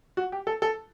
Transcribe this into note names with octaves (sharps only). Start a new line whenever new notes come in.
F#4
G4
A4
A4